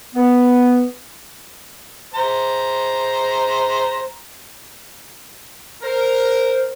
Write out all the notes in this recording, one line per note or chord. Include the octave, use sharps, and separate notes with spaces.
B3
C5 A#5
A#4 C5